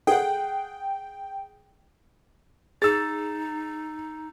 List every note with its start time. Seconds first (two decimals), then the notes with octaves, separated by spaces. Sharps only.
0.07 G#4 F#5 G5
2.82 D#4 G#4 E6 A6